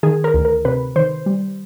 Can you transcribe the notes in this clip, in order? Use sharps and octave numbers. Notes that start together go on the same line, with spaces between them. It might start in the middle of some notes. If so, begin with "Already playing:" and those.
D#3 G#4
A#4
D2
A#4
C3 B4
D#3 C5
G3